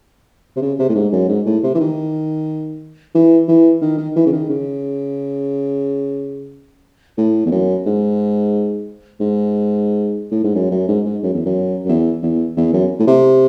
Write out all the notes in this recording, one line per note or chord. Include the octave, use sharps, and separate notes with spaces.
C3
C#3
C3
A2
G#2
F#2
G#2
A2
C3
E3
D#3
E3
E3
D#3
D#3
E3
C#3
D#3
C#3
A2
E2
F#2
G#2
G#2
A2
G#2
F#2
F#2
G#2
G#2
F#2
E2
F#2
F#2
E2
E2
E2
F#2
A2
C3